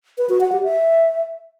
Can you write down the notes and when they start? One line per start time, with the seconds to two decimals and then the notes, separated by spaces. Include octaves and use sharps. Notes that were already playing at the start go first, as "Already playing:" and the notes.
0.18 B4
0.29 F#4
0.41 F#5
0.52 G4
0.63 E5